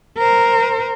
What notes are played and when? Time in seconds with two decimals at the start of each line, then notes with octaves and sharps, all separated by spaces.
0.18 A#4 C5